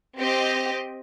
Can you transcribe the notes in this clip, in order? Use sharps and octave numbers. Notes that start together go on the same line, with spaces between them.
C4 G4 D#5